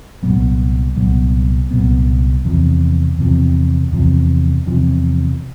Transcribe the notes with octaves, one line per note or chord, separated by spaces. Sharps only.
C2 A#2 F#3 B3
C2 A#2 F#3 B3
C2 A#2 F#3 B3
E2 C3 F3
E2 C3 F3
E2 C3 F3
E2 C3 F3